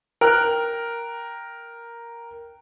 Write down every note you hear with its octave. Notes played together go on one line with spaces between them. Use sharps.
A#4 G5 F6 F#6